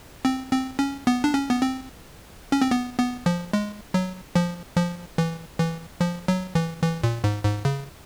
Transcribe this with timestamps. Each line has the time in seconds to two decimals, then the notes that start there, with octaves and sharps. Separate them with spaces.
0.25 C4
0.52 C4
0.79 C#4
1.07 B3
1.24 D4
1.34 C#4
1.50 B3
1.62 C4
2.52 C#4
2.62 C4
2.71 B3
2.99 B3
3.26 F3
3.53 G#3
3.94 F#3
4.35 F3
4.77 F3
5.18 E3
5.59 E3
6.01 F3
6.28 F#3
6.55 E3
6.83 E3
7.04 A#2
7.24 G#2
7.44 G#2
7.65 C#3